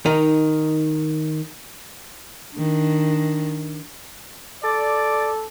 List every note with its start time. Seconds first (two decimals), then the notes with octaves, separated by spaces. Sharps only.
0.06 D#3 D#4
2.56 D#3 D4
4.64 A4 D5